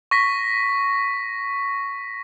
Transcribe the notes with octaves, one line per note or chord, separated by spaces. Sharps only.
C#6 A#6 B6